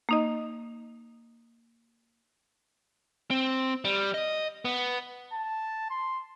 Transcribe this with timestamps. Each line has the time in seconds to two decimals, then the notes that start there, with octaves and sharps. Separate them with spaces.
0.09 A#3 D#4 D#5
3.31 C4
3.85 G3
4.14 D#5
4.65 B3
5.33 A5
5.90 C6